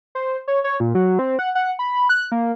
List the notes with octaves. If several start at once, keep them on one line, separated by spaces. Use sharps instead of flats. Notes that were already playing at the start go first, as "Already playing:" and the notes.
C5
C#5
C#5
A#2
F#3
C4
F#5
F#5
B5
F#6
A#3